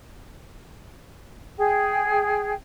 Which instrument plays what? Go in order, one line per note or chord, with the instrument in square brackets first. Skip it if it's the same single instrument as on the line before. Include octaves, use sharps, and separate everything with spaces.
[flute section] G#4 G5